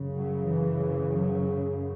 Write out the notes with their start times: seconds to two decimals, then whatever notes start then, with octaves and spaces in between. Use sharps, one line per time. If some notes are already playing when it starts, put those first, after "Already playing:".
Already playing: F#2 C#3
0.14 F#3
0.49 E3
1.19 F#3